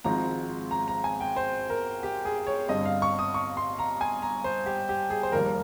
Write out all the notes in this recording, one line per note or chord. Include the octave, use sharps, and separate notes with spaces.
G#1 G#2 F3 G#3 C4 A#5
A#5
A#5
G#5
G5
C5
A#4
G4
G#4
C#5
G1 G2 G3 C4 D#5
F5
C#6
D#6
C#6
C6
A#5
G#5
A#5
C5
G4
G4
G#4
C5
F1 D#2 D#3 G3 A#4